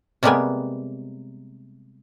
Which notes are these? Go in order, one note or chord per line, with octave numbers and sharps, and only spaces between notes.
C3 G3 G#3 A#3 B3 G#5